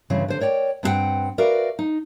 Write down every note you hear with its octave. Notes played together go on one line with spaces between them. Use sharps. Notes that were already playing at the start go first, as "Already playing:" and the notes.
G2 C#3 E3 C4
D3 C5
A#4 C#5 D5 G5
G2 C4 D#4 G4 F#5 G5
F#4 A#4 B4 D5 E5 F5
D#4